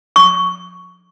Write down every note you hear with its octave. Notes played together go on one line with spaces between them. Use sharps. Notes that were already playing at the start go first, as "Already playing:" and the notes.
C#6